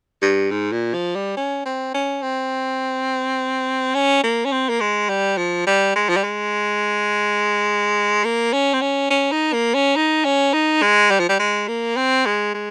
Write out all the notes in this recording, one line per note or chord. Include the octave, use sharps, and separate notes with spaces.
G2
G#2
A#2
F3
G3
C#4
C4
C#4
C4
C#4
A#3
C#4
C4
A#3
G#3
G3
F3
G3
G#3
F3
G3
G#3
A#3
C#4
C4
C#4
C#4
D#4
A#3
C#4
D#4
C#4
D#4
G#3
G3
F3
G3
G#3
A#3
C4
G#3
G#3